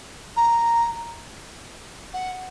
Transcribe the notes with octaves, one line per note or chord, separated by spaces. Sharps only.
A#5
F#5